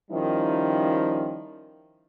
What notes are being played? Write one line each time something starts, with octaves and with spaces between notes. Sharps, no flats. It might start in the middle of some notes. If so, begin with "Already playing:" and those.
D#3 F3 G3 C#4 D#4 E4